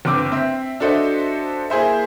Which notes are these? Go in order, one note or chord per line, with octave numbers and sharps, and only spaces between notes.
G1 C4 D6 E6
C4 E5
D4 F#4 A4 C5 D#5 E5
A#3 E4 G#4 C5 E5